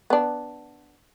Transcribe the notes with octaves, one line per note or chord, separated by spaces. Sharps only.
B3 D4